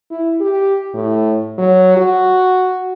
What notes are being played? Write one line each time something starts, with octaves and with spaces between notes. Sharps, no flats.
E4
G4
A2
F#3
F#4